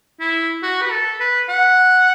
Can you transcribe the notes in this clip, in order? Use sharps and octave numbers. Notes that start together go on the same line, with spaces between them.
E4
F#4
B4
A4
B4
F#5